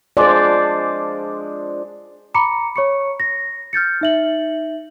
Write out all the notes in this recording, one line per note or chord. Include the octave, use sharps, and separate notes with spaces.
F3 G#3 D4 C5 D5
A#5 B5 D6 C#7
C#5 C#6 C#7
A#6
F6 G6 A6 C#7
D#4 E5 F#7